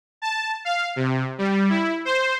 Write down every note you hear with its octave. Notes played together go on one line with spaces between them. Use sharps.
A5
F5
C3
G3
E4
C5